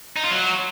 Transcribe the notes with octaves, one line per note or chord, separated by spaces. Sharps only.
D#4
F4
F#3